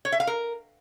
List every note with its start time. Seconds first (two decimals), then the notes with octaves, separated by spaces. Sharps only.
0.05 C#5
0.12 E5
0.20 F5
0.27 A#4